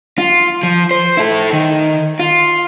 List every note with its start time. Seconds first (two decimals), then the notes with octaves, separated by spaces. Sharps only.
0.18 F4
0.63 F3
0.91 C5
1.17 E4 A4
1.53 D#3
2.20 F4